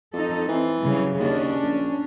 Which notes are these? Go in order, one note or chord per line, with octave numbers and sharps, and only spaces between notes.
F2 D#4 A4
E3 C4
C#3 F#3 G3
D#2 C#4 D4
A#1